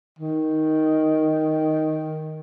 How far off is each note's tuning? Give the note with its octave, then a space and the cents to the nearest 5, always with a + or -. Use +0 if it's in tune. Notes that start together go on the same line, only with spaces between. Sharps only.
D#3 +5